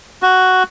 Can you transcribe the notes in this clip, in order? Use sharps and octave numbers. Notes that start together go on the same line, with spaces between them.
F#4